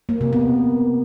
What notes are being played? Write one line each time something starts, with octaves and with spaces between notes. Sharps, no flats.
A#3
C3
B3